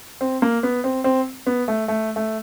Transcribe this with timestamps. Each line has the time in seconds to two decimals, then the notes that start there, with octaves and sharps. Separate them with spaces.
0.21 C4
0.42 A#3
0.63 B3
0.84 C4
1.04 C4
1.47 B3
1.68 A3
1.88 A3
2.16 A3